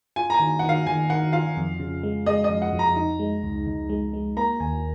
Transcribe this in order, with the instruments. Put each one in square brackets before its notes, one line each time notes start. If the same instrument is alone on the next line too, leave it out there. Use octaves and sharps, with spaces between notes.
[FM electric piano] F4 [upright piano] G#5
[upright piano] A#5
G#5
[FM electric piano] D#3
[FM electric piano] D#3 [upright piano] F#5
[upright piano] F5
[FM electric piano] D#3 [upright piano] G#5
[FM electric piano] D#3 [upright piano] F#5
[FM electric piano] F4 [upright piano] F5
[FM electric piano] F2
C#3
G#3
[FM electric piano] G#3 [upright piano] D#5
[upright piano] D#5
[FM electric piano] F2
[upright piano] F#5
[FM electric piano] F2
[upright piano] A#5
[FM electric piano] D#4
G#3
C#2
C#2
G#3
G#3
[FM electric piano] A#3 [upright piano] A#5
[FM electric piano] D#2 [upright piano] G#5